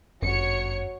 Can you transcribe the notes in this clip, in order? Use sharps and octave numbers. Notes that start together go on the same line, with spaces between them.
G1 F#2 F#3 C#5 C#7